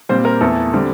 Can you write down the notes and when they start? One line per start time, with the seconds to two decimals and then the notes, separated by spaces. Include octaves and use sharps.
0.09 A#2 G3 C4 C5
0.25 A#4
0.41 E2 E3 A3 A4
0.73 D3 G3 C4